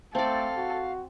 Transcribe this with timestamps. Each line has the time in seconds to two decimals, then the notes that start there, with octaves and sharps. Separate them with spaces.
0.15 A3 C4 A4 D5 F5
0.57 F#4